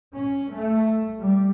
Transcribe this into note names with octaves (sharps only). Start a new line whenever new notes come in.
C#4
A3
G3